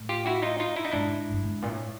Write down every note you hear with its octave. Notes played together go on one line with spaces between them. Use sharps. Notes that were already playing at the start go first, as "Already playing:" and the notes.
Already playing: A2
F4 G4
E4 F#4
D#4 F4
D#4 F4
E4
D#4
G#2 D4 E4
G2
G#2
A#2
A2